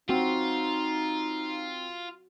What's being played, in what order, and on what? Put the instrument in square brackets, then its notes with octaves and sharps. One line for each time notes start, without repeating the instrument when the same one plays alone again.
[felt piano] C4 [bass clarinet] D#4 [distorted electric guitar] F4 [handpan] F#4